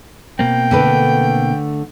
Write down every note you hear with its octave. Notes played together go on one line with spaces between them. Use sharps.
B2 A#3 C4 G5
D3 A3 B4